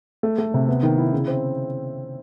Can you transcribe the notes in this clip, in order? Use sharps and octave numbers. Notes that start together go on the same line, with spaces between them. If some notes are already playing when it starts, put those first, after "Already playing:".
A3
A3
C3
B3
D#3
E4
C#3
C4